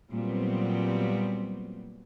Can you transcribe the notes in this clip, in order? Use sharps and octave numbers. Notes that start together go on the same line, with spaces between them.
A#2 F#3 G3 B3 C4